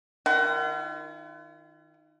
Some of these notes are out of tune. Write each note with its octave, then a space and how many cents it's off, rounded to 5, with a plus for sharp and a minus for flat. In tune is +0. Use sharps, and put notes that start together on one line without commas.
D#3 +0 F4 -40 F#5 +30